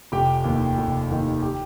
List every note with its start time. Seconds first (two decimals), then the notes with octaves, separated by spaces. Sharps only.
0.12 F1 G4 G5
0.44 D#2 D#3
0.78 F1
1.11 D#2 D#3
1.42 G4 G5